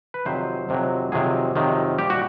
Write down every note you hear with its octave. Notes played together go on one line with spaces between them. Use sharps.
B4
F2 C3 D#3 F#3 C5
F2 C3 D#3 F#3
F2 C3 D#3 F#3 G#4
F2 C3 D#3 F#3
A#2 G3 G4
F#4